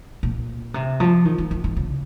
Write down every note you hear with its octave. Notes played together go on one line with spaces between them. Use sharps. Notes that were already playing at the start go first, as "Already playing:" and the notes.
A#2
C3
F3
D#3
D#3
D#3
D#3
C#3